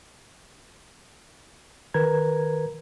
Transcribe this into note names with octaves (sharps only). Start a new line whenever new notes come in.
D#3 A#4 B4 A#5 G#6